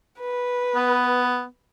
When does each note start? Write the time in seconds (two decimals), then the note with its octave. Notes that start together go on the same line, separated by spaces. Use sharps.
0.20 B4
0.75 B3